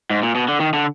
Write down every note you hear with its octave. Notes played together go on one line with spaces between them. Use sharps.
G#2
A#2
B2
D3
D#3
D3